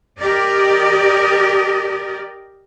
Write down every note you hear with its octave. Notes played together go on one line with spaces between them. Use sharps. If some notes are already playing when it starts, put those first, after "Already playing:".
G4 A#4 D5 D#5